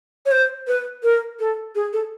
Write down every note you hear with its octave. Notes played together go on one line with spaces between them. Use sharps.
C#5
C5
B4
A#4
A4
G#4
A4